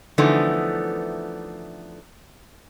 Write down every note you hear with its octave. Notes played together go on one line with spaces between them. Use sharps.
D3 E3 F3 A3 B3 D#4